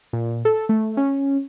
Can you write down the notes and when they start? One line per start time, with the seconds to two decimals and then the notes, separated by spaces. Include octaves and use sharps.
0.13 A#2
0.45 A4
0.69 A3
0.97 C#4